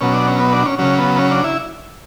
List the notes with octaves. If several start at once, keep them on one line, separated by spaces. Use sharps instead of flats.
B2 F#3 C#4
D4
C#4
B3
D4
C#4
C#3 F#3 C#4
B3
C#4
D4
E4